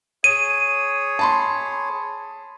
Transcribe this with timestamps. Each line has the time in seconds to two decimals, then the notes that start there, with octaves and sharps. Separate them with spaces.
0.24 G#4 C#5 D#7
1.19 A5 B5 C6